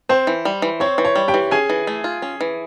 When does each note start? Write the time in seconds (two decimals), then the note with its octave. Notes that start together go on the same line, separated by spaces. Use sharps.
0.09 C4 C5
0.27 E3
0.45 G3
0.62 E3
0.80 C4 C#5
0.98 E3
1.05 C#5
1.16 G3
1.28 G4 G5
1.34 E3
1.51 C#4 G#4 G#5
1.70 E3
1.87 A3
2.04 F4
2.22 C#4
2.41 E3